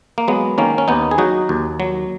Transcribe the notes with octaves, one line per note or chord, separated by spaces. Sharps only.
A#3
F#3 G#3 B3
D#3 A#3 C#4
C#4
D#2 B3 D#4
G#4
F#3 D#4 F#4
D#2
F#3